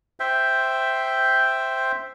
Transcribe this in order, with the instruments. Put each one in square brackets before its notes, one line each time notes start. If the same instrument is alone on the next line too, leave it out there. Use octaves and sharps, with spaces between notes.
[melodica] C5 E5 G5